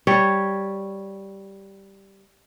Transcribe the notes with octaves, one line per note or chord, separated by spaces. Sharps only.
G3 C#5